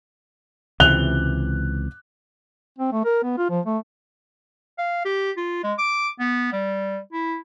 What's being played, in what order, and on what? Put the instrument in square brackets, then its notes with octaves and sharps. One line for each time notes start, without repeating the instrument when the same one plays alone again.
[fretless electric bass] C#2 C3 E3 [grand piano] F#6 F7 G7
[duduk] C4
A3
A#4
B3
F4
F3
A3
[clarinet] F5
G4
F4
G#3
D6
B3
G3
E4